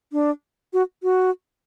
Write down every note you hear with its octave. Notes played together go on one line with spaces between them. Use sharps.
D4
F#4
F#4